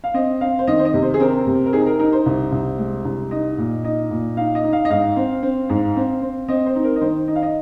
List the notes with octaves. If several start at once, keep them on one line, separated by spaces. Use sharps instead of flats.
F5
C4 D#5
C4 F5
C5
D#3 D#5
C5
D#5
C3
C5
G#4
C4 A#4
C3
A#4
D#4 G#4
A#4
D#4 A#4
C5
C2
C2
G#3
C2
D#4 D#5
A#2
D#4 D#5
A#2
D#4 F5
D#5
D#4
F5
D#5
G#2 F5
C4
C4
G#2
C4
C4
C4 D#5
C5
D#4
A#4
D#5
D#3 C5
D#4 D#5
F5
D#5